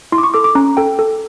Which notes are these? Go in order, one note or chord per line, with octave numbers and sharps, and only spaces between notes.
E4 C6
D6
C#6
A4 D6
D6
C#4 A#5
A4 G5
A4